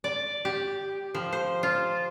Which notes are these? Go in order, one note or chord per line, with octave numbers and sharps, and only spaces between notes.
D5
G4
F3
C5
F4